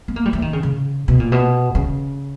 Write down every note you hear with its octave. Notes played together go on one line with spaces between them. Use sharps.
B3
A#3
G3
E3
D#3
C#3
C#3
B2
A#2
B2
C#3